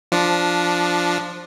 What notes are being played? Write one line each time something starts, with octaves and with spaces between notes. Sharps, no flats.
F3 D4